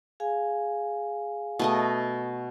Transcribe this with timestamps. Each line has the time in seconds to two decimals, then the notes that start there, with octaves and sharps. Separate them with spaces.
0.20 G#4 F5 G#5
1.59 B2 A3 D#5